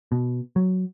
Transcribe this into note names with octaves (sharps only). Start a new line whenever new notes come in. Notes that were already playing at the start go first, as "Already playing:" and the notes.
B2
F#3